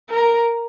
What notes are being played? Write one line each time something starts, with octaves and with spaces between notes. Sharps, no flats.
A#4